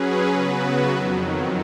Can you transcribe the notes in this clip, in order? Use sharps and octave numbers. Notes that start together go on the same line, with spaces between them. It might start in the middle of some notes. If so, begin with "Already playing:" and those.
Already playing: F#3 C#4 G#4 B4
C#3 F#3 B3 F#4 B4
F2 D#3 F#3